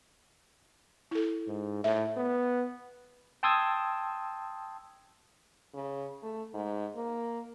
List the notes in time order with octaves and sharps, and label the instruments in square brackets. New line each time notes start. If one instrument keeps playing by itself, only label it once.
[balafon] E4 A4
[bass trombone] G#2
[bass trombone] A2 [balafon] E5
[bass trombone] B3
[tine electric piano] G5 A5 C6 D#6 E6 G#6
[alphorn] C#3
A3
G#2
A#3